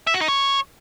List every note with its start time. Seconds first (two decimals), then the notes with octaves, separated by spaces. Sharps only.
0.07 E5
0.14 F#4
0.21 D#4
0.28 C#5